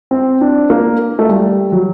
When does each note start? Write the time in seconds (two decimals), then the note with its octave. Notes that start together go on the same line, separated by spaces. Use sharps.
0.11 C4
0.41 D4
0.70 A#3
1.19 A3
1.29 G3
1.72 F#3